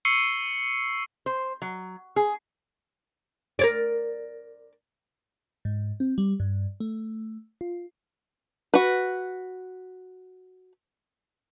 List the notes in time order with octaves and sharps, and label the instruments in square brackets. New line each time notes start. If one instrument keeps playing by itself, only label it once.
[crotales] C#6 E6 C7 C#7 D#7 G7
[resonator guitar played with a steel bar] C5
F#3
G#4
[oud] A#4 C#5 D5
[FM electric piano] G#2
C4
G3
G2
A3
F4
[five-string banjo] F#4 B4